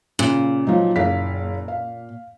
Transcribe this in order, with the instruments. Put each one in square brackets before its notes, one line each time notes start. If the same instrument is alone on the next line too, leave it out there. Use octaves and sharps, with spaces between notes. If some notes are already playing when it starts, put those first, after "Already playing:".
[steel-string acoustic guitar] A#2 [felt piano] C#3
[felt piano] F3 F#3 D#4
F#1 F5 B6
F5